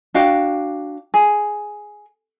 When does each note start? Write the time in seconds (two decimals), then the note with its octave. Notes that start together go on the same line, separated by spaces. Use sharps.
0.14 D4 F#4 F5 G5
1.14 G#4